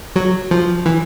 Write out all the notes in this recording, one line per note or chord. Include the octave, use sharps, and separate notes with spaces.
F#3
F3
E3